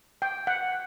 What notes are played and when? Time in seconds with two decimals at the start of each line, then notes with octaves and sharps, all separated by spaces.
0.22 G5
0.47 F#5